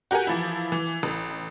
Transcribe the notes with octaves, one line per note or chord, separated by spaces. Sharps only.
F#4 G4 A#4 F#5 G#5
E3 F3 E4
E3
A1